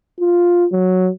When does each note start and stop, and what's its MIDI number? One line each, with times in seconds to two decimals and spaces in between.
0.20 0.66 65
0.72 1.10 54